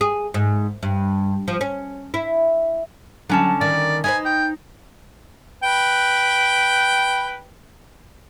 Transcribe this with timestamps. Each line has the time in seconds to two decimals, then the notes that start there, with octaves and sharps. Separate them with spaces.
0.01 G#4
0.34 G#2
0.83 G2
1.48 F3
1.61 C#4
2.14 E4
3.29 D3 F#3 C#4 A5
3.61 D#3 D5
4.04 D#4 B4 C5 G#5
4.25 G5
5.63 B4 G5